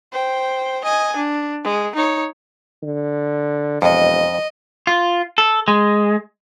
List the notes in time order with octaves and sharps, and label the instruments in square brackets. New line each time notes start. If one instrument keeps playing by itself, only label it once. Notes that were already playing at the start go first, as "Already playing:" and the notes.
[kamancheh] C5 G5
D#5 G#5
D4
G#3
D#4 C#5
[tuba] D3
[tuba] E1 [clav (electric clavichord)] F2 [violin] D#5
[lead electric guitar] F4
A4
G#3